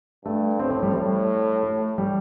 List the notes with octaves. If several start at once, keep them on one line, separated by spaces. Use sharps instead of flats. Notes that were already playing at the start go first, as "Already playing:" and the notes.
G2 A3
A2 C4
C4
G3
A2 G3
A3
G3